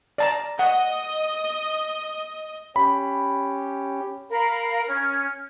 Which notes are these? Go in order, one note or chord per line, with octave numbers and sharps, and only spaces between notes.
D5 A5 A#5
D#5 F#5
C#4 G4 B5
A#4 F5 A#5 B5
C#4 F6 G#6